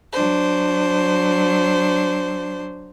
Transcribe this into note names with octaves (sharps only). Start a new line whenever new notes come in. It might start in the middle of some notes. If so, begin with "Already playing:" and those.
F#3 D4 C5